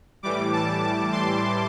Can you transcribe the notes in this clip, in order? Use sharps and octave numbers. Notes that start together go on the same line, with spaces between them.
A2 E3 G3 D6
A5
A5
C6